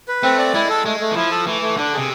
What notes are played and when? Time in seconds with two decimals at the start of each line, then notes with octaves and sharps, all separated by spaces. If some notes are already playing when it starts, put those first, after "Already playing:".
0.08 B4
0.23 A3 C4
0.39 D5
0.54 G#3 E4
0.69 A4
0.85 G#3 A3
1.00 A3
1.11 E3
1.16 F3 E4
1.31 A4
1.46 E3 A3
1.62 A3
1.77 D3 D4
1.93 C3 G#4